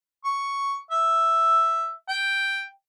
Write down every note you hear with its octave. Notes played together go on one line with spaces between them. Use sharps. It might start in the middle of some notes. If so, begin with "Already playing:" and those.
C#6
E5
G5